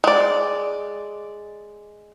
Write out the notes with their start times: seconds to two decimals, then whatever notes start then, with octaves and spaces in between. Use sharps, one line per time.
0.04 G#3 D5